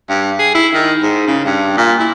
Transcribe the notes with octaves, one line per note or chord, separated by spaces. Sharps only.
G2
G#4
E4
D#3
G#2
C#3
G2
A#2
E4